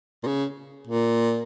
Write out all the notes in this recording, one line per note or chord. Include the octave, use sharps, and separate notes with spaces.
A#2
C#3
A#2